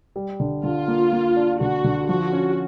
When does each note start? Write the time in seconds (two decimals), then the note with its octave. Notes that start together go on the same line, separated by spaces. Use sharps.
0.16 G3
0.40 D3
0.64 D3 F4
0.88 A#3
1.12 A#3
1.36 D4
1.61 D3 F#4
1.84 D3
2.09 F3 F#4
2.33 C#4